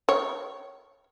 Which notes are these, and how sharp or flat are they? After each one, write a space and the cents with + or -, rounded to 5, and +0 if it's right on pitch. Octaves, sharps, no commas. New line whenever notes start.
C#5 +0 G5 -35